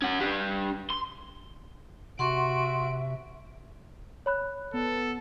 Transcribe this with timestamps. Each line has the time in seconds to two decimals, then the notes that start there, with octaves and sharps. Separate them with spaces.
0.02 C#4 F#5
0.20 D4 G4
0.90 C6
2.19 C3 F#4 E5 F#5 C6 C#6 D7
4.26 C#5 B5 F#6
4.74 B3 A4